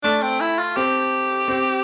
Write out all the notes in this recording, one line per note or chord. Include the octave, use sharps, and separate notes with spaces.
A3 D4
C4
E4
F4
C4 G4
C4